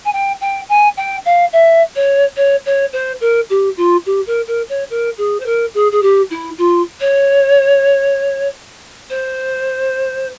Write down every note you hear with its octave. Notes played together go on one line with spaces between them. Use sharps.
G#5
G5
G5
G#5
G5
F5
E5
C#5
C#5
C#5
C5
A#4
G4
F4
G4
A#4
A#4
C#5
A#4
G#4
C5
A#4
G#4
G#4
G4
E4
F4
C#5
C5